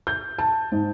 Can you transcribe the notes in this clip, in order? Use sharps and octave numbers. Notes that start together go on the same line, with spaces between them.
G6
A5
G#2